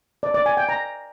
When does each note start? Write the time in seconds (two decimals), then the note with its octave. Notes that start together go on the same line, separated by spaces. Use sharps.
0.23 D5
0.34 D5
0.46 G#5
0.57 G5
0.69 A#5